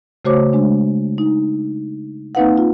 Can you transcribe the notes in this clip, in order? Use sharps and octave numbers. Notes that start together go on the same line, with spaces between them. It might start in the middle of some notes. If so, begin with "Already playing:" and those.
C#3 A3 F#4 C5 C#5 D6
G#3 D4
D#4
A#3 C4 D#4 B4 F5 F#5
F4